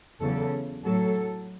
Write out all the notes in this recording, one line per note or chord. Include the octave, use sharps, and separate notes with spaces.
E2 C#3 F#3 A4
A2 F#3 A4